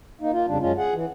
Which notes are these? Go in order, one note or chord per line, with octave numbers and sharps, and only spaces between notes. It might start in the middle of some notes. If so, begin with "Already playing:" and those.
A#3 D#4
A#3 F4
F2 C#3 G3 D4
F#2 G#3 C#4 F4
G#4 F#5
E3